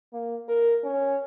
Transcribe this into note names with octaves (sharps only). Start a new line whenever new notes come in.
A#3
A#4
C#4